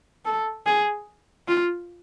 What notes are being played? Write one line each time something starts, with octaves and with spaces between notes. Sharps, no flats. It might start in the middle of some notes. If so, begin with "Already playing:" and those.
A4
G#4
F4